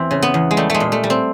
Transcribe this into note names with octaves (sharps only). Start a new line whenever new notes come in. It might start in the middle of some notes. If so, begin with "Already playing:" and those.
Already playing: E2 E3 C4
C#3
B3
E2
G#3
G3 A3
G#3 A3
A#2
A3
G3
C4